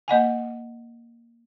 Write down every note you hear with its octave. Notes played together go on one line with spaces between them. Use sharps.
A#3 D#5 F#5 G#5